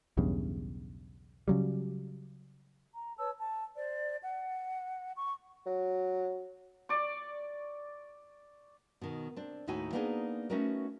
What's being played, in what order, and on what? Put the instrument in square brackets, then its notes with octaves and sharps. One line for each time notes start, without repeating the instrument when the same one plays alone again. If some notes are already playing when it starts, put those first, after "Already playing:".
[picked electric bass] B1 E2 G2 C#3
C#3 F#3 G3
[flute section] A#5
B4 C#5 A5 E6
A5
C5 D5
F#5
C#6
[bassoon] F#3
[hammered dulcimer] D5 C#6
[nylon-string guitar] B2 D#3
C4 D4
D#2 A2 D#4 E4 F#4 G#5
A#3 B3 D4 D#4 F#4 G#4
A3 B3 C#4 D#4 F#4 A#4